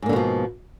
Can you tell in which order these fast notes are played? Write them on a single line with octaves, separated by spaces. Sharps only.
G#2 A#3 D3 B2 F3